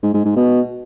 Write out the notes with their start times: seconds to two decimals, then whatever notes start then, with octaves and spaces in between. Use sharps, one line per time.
0.03 G#2
0.14 G#2
0.25 G#2
0.36 B2